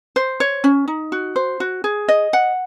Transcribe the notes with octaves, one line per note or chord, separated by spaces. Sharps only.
C5
C#5
C#4
D#4
F#4
C5
F#4
G#4
D#5
F#5